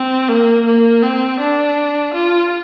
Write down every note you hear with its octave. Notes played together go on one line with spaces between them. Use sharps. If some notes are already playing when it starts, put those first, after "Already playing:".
Already playing: C4
A#3
A#3
C4
D4
F4